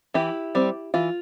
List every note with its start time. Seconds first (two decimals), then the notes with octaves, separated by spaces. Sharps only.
0.14 E3 E4 G4
0.55 G3 C4
0.94 E3 F4